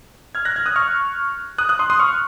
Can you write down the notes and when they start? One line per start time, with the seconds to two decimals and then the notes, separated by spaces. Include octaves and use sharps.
0.35 F6 G#6
0.45 F#6 A#6
0.56 F6 G#6
0.66 D#6 F#6
0.76 C#6 F6
1.58 D#6 F#6
1.69 D#6 F#6
1.79 C6 D#6
1.90 C6 D#6
2.00 C#6 F6